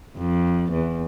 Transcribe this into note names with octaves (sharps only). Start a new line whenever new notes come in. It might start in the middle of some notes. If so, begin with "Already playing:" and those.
F2
E2